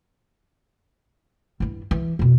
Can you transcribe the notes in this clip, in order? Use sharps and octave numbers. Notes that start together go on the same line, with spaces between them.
G2 E4
E3
F2 B2